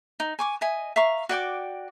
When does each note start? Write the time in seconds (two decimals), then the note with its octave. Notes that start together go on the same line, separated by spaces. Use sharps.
0.20 D#4
0.39 G#5 C#6 D6
0.61 D#5 E5 G#5
0.96 E5 F5 A#5 C#6
1.29 F#4 D5 G5 D6